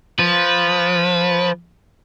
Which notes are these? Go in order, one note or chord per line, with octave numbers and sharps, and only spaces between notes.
F3 B4